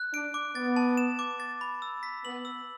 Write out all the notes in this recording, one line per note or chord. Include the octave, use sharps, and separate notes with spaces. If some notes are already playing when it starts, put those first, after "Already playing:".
Already playing: F#6
D4 D7
D6
B3 A6
A5
E7
D6
A6
B5
E6
B6
B3 F#7
E6